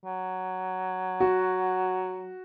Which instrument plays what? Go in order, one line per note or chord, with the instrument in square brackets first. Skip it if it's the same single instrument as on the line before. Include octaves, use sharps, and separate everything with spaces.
[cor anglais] F#3
[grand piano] F#4